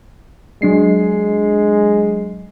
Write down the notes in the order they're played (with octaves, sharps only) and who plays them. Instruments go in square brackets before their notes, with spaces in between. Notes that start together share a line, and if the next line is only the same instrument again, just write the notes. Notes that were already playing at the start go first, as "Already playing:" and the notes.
[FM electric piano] F#3 D4 C7 [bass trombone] G#3